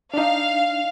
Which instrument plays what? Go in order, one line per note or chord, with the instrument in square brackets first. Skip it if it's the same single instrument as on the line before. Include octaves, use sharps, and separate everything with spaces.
[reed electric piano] D4 D#4 [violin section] F5